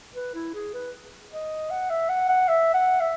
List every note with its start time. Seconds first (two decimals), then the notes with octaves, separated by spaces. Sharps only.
0.15 B4
0.35 E4
0.54 G#4
0.74 B4
1.32 D#5
1.70 F#5
1.90 E5
2.09 F#5
2.29 F#5
2.48 E5
2.74 F#5
3.00 E5